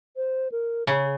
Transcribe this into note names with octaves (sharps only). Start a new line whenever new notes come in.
C5
A#4
C#3 G#4